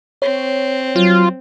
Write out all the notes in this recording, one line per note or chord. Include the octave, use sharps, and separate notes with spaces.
C4 C#5
F#3 F4